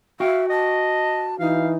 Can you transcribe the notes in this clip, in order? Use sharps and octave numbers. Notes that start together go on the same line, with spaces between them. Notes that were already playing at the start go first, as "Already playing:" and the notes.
F#4 E5 F5 G5
D#5 A5
E3 D#4 F5